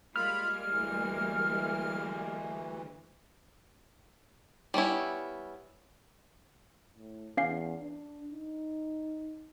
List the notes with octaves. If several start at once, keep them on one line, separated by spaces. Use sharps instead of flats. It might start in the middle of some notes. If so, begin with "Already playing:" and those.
G3 G#3 A#3 F4 B5 F6
D2 E3
G3 B3 C#4 E4
A2
E2 C#4 F5 C7
D4
D#4